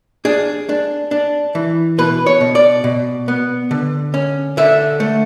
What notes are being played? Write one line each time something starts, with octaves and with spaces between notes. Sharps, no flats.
D4 G#4
D4
D4
E3
B2 B4
C#5
B2
D5
B2
B3
D3
C#4
D3 E5
A3